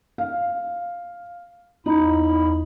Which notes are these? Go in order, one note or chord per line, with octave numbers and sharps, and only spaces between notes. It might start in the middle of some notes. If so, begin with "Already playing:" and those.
F5
E2 D#4 E4 B5